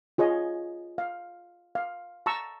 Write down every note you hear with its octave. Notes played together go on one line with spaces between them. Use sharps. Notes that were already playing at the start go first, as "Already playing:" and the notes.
F4 G#4 C#5 D#5
F5
F5
A5 A#5 C#6 E6